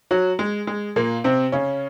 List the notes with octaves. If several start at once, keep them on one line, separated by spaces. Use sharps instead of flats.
F#3 F#4
G#3
G#3
A#2 A#3
C3 C4
C#3 C#4